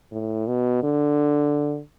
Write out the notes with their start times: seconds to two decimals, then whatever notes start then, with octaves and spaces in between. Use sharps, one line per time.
0.12 A2
0.47 B2
0.83 D3